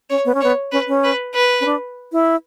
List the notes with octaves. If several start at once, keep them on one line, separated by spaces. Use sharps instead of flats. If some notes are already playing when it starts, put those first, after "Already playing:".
C#4 C#5
B3
C#4
B3 C#5
C#4 B4
C#4
B4
B4
C#4
D4
E4